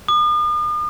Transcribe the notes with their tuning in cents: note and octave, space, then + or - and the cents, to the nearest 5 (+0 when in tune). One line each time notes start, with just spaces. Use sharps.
D#6 -45